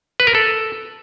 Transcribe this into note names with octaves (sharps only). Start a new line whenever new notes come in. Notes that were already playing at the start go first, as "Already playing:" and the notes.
B4
A#4
A4